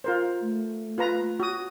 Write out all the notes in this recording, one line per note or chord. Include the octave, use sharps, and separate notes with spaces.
F4 A#4 C5
A3
F4 B4 A#5
F#4 D#6